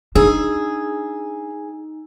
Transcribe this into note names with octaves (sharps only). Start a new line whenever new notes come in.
D4 D#4 G#4 E6